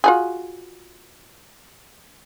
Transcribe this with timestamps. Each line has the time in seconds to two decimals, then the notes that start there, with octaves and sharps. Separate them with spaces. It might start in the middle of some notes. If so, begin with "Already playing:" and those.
0.04 F4 F#4 G#4